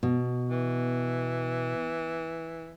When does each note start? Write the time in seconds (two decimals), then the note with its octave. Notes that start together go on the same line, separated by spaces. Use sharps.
0.03 B2
0.50 E3